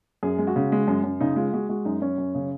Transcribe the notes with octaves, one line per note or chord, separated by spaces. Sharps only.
F#2 G#4
G#3
F#4
C#3
G#3
F#2
F#2
C#3 D#4
G#3 F4
G#3 F#4
G#3 F#4
F#2 D#4
F#2 C#4
F#2
C#3